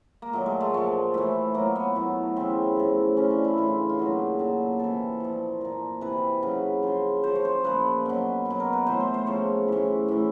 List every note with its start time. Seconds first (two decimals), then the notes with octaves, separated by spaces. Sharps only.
0.22 A#3
0.33 A#2 F#3 A3
0.46 G#3
0.60 A3
0.74 A#2 F3 A3
1.14 A2 E3
1.54 A2 F#3 A#3
1.76 B3
1.95 A2 F#3
2.36 C#3 E3 C4
2.76 A2 F3
3.17 C#3 E3 C#4
3.31 D4
3.44 E4
3.58 A2 E3 F4
3.89 F4
3.99 A#2 F#3 F#4
4.13 G4
4.19 G#4
4.39 A#2 F#3 A4
4.79 C3 E3 A4
5.20 A#2 F3
5.61 A#2 F3 A#4
6.01 C3 E3 B4
6.43 C#3 F#3
6.83 C#3 F3 C5
7.24 C#3 F3 C5
7.35 C#5
7.45 C5
7.64 A#2 F3 B4
8.05 B2 F#3
8.45 B2
8.51 F#3
8.60 A#4
8.73 B4
8.86 A2 E3 C5
9.00 C5
9.14 C5
9.26 C#3 F3 C#5
9.68 A2 E3
10.08 A2 E3